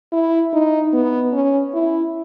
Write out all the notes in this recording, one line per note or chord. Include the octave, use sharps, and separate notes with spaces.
E4
D#4
B3
C#4
E4